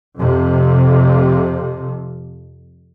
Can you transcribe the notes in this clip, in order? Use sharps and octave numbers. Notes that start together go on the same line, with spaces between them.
F2 C3